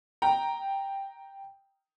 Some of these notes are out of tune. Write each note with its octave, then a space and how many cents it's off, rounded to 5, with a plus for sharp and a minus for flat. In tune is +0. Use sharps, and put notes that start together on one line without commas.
G5 +0 A#5 +0